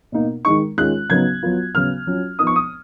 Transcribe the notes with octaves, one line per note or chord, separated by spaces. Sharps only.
B2 A#3 D#4
D#3 G#3 D#4 C#6
D#3 G#3 C#4 F4 F#6
C#3 F#3 B3 D#4 G#6
F#3 B3 F4
C#3 F#3 B3 F6
F#3 C#4 F4
F3 B3 D#4 D#6
C#6
D#6